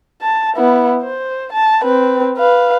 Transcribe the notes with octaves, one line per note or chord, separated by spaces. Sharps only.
A5
B3 E4
C5
A5
C4 B4
B4 F5